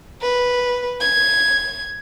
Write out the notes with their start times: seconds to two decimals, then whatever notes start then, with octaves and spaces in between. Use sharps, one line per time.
0.22 B4
1.00 G#6